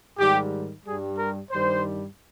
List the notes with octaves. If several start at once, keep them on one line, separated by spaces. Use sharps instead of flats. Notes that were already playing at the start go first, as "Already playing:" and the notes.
G#2 D#3 G3 G4
G2 G3 G#4
A#4
G2 D#3 G3 C5